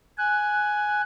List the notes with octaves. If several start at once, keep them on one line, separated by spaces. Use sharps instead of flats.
G#5 F#6